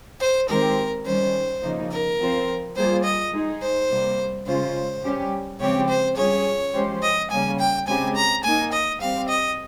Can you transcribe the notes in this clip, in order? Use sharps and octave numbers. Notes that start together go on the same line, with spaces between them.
C5
D#3 G#3 C4 G4 A#4 C5
D#3 G3 C#4 C5
C#3 F3 A#3 D#4
A#4
F3 C4 F4 C5
G3 A#3 F4 G#4 C5
D#5
G#3 D#4 G#4
C5
C3 G3 A#3
C#3 G#3 C#4 F4 C5
G3 C#4 G4
C#3 F3 G#3 C4 G4 C#5
C5
G3 C#4 F4 G#4 C#5
F3 G#3 C#4 G4 C5
D#5
C#3 G3 A#3 C#4 G#5
G5
C#3 G#3 C4 G4 G#5
A#5
A#3 D#4 A#4 G#5
D#5
G3 C4 G4 F5
D#5